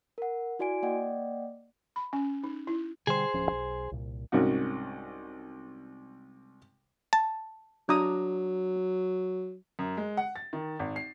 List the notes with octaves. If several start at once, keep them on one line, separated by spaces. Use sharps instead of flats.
A#4 F#5
E4 F#4 D5 G#5 D7
A#3 D5 D#5 F#5 G5
B5
C#4
D#4
E4
B2 D3 G3 G#4 C5
D1 F3 C#4
B1
C2 A#2
C2 G#2 C#4 F#4
A5
F#3 D4 A#5 D#6
F#2
G#3
F#5
A6
D#3
G#1
C7